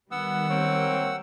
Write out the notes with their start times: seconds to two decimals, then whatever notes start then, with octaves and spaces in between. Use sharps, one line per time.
0.12 D#3 G3 B3 F#5 E6
0.50 A#3 C4 C#5